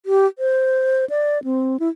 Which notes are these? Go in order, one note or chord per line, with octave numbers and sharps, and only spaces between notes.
G4
C5
D5
C4
E4